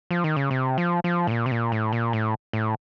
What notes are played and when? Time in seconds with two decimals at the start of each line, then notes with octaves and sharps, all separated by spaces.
0.11 F3
0.24 D#3
0.36 C#3
0.51 C3
0.78 F3
1.04 F3
1.27 A2
1.31 A#2
1.46 C3
1.52 A#2
1.72 A2
1.93 A#2
2.13 A2
2.53 A2